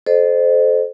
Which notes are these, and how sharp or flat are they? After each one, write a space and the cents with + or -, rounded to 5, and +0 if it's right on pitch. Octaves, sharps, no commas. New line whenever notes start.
A4 -30 C5 -10 D#5 -40